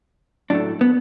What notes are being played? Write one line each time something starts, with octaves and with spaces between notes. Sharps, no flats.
A2 F#3 A3 D4
B3